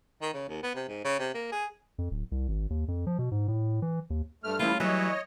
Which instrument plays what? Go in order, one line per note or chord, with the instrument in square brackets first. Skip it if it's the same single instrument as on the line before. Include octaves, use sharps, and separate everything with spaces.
[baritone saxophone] D#3
C#3
D#2
B3
C3
G#2
C#3
C3
A#3
G#4
[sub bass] F2
D1
C2
G#1
D#2
F2
F3
B2
G#2
A2
E3
D#2
[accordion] G2 A3 F6
[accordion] E3 F3 E4 [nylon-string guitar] G3 A3 C#4 [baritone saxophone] F4
[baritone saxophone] E3 [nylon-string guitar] F#3 G3 [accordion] C#5 D#5